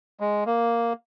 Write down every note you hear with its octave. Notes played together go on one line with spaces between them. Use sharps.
G#3
A#3